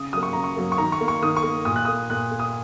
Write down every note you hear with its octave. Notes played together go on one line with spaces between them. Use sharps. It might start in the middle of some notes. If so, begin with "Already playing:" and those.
Already playing: C#3 D#6
F#3 A#3 D#6
C#6
C#3 A#5
C#6
F#3 A#3
C#6
D#3 A#5
C#6
A#3
C#6
D#3 D#6
C#6
A#3
A#2 D#6
F#6
A#3 D#6
A#2 F#6
A#3
D#6